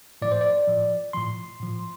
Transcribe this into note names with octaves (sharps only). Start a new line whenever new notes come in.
A2 F3 D5
C5
D5
A2 F3
A2 F3 C6
A2 F3